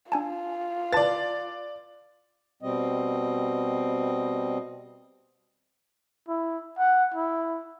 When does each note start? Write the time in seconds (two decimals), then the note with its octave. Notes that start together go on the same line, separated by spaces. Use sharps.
0.12 D4 F4 G#5 A5
0.93 B4 D5 A5 A6
2.62 B2 G3 C4 D#5
6.28 E4
6.78 F#5
7.14 E4